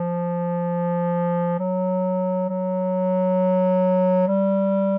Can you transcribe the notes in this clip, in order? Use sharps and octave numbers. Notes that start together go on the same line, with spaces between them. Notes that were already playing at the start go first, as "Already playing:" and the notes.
Already playing: F3
F#3
F#3
G3